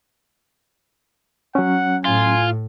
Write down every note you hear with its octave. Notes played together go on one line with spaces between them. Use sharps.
F#3 C#4 F#5
A2 F4 G#5